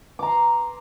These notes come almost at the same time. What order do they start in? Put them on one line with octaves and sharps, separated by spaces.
D6 A#5 C6